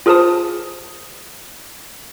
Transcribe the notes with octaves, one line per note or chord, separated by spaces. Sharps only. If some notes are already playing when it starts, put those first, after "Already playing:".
F4 G#4 A#4 C5 A5 D#6